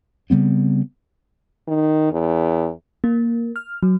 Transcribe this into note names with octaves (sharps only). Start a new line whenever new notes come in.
C#3 G3 B3 C4
D#3
E2
A#3
F6
F#3